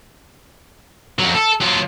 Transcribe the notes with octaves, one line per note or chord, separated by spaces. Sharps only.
F2 F#3
A4
F#3 F4